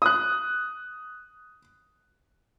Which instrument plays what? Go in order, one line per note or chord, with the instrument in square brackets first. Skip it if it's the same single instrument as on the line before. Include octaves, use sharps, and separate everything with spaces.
[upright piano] D#6 F#6